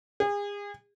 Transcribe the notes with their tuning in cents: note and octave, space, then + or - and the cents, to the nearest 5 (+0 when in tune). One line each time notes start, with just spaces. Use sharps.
G#4 -35